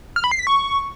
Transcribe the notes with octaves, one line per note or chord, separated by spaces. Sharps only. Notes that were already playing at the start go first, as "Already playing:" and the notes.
F6
B5
C7
B6
C#6